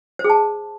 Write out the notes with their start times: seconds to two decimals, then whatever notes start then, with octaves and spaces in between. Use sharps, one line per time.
0.19 C5
0.24 G#4
0.30 A5